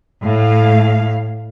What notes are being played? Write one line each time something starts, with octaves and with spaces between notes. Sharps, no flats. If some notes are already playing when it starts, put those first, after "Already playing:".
A2 F5